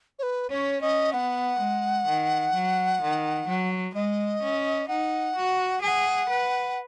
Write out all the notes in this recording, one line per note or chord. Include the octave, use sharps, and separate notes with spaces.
C#5
B4
C#4 C#5
C#4 D#5
B3 F#5
G#3
D#3
F#3
D#3
F#3
G#3 D#5
C#4
D#4 F#5
F#4
G#4 G#5
F#5
B4